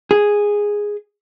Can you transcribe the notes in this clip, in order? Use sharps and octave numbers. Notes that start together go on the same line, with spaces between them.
G#4